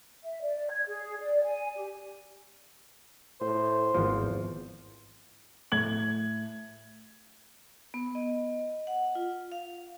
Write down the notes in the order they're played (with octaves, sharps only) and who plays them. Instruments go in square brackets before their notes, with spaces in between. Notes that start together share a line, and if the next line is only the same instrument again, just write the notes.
[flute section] E5
D5
G#6
G#4
D5
G#5
G4
[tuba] A2 [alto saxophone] C5
[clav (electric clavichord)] G#1 F3 [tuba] E2
[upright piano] A2 G#6 F#7
[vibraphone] B3
D#5
F#5
F4
F5